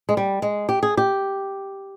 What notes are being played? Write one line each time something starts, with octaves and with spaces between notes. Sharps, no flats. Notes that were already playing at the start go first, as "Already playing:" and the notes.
G#3
G3
G#3
G4
G#4
G4